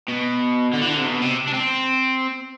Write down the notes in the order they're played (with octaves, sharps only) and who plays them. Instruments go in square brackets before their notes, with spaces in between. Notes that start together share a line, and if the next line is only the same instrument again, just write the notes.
[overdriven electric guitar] B2
D3
E3
D3
C3
B2
C3
D4
C4